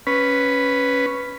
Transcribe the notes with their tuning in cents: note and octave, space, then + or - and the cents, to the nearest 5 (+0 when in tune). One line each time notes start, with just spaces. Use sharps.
C#4 +0 B4 +0